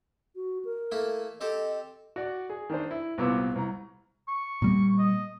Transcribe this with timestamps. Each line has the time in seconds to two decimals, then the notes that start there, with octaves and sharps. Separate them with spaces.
0.36 F#4
0.65 A#4
0.92 A3 A#3 E4
1.41 C4 G4 A4 D#5
2.16 F#4 D5
2.50 G#4
2.70 D#3 D4 C5
2.91 E4
3.18 C2 A#2 B3 C4 D6 E6
3.55 C2 A#5
4.28 C#6
4.62 A#2 G3 A#3
4.99 D#5